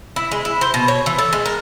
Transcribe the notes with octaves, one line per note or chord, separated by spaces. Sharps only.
E4
G#3
E4
C5
B2
C#5
E3
A4
G#3
A#4